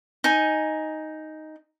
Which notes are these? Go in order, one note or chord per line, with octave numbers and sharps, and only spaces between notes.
D#4 G#5